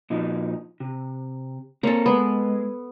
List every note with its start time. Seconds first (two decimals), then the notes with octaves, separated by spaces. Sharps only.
0.10 A#2 F3 D#4
0.80 C3
1.83 A#3 C4 A4 C#5
2.06 G#3 B3